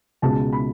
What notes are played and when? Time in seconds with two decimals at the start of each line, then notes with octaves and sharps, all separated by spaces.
0.22 C#2 B2 G#3 A5
0.53 B5